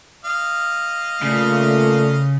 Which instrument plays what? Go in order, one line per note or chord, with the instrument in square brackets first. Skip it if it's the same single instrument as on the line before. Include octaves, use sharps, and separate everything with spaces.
[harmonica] D#5 F5
[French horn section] A#2 A3 [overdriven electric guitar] C#3